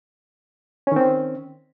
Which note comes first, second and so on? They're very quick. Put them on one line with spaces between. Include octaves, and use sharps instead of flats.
C#4 D#3 C4